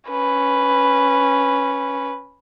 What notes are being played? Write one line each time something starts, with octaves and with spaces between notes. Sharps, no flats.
C#4 B4